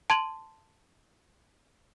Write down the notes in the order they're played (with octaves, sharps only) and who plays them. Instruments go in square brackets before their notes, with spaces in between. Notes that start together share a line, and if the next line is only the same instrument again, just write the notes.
[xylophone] A5 C6 G#6 D#7 F#7